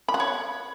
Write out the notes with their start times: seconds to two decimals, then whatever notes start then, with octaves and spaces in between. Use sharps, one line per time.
0.08 B5
0.14 F#5
0.20 C#5